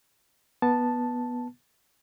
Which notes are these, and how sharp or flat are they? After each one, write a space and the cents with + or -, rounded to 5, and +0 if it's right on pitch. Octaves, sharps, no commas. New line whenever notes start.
B3 -10 A5 +0